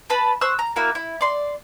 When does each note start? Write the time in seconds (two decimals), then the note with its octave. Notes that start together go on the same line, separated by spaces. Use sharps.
0.10 B4 A5 B5
0.41 C5 C#6 E6 F#6
0.59 A#5
0.76 A#3 E4 F#4 A#4
0.95 E4
1.21 D5 C6